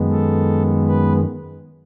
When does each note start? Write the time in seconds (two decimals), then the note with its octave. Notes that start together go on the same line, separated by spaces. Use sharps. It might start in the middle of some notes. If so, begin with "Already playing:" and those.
Already playing: F#2 D#3 G#3 B3
0.10 A4
0.87 B4